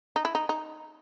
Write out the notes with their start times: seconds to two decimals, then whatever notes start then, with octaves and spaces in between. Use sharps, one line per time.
0.16 D#4
0.25 E4
0.35 D#4
0.49 D#4